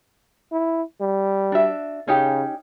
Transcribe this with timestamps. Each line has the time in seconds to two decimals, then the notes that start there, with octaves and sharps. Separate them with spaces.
0.52 E4
1.01 G3
1.52 D4 F#4 E5
2.08 C#3 C#4 D#4 G4